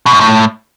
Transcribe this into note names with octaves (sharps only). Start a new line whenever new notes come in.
B2
F#2
A2